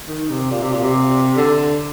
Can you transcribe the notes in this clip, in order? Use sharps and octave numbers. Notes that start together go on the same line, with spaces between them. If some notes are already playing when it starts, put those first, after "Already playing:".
D#3
C3
A#2
C3
A#2
C3
D3